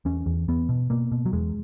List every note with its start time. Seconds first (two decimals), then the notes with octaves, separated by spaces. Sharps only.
0.05 E2 C#4
0.26 E2
0.48 E2 B3
0.69 B2
0.90 B2 A#3
1.12 B2
1.26 F#3
1.32 E2 G#3